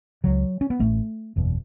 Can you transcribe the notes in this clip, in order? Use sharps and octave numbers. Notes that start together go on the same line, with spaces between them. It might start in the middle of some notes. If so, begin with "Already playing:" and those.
C#2 C#3 F#3
C#4
B3
A1 A2 A3
F#1 E2 B2